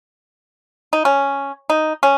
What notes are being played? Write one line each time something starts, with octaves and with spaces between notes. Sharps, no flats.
D#4
C#4
D#4
C#4